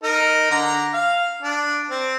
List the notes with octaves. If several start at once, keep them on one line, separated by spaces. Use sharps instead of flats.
D#4 A#4
D3 A#5
F5
D4
C4